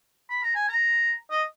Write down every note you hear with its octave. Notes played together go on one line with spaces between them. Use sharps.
B5
A#5
G#5
A#5
D#5